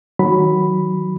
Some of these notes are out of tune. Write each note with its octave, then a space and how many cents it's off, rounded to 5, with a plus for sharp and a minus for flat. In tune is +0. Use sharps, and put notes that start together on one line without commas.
D#3 +25 F#3 +0 B5 +0